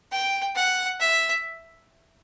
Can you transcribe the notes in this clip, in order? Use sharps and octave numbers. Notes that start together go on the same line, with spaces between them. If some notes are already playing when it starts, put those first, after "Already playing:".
G5
F#5
E5